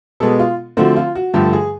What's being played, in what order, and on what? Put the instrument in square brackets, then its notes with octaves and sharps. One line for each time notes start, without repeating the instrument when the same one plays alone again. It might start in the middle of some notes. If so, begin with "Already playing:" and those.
[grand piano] B2 G#3 B3 A4
F4
D3 F3 A3 C4 F#4
F4
F#4
G2 D3 F3 A3 G4
G#4